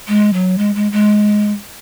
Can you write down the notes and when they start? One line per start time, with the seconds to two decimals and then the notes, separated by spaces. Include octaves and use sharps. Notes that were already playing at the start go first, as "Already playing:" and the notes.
0.08 G#3
0.33 F#3
0.58 G#3
0.75 G#3
0.92 G#3